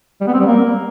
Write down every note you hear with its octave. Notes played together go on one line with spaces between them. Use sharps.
G3
B3
C4
G3
A#3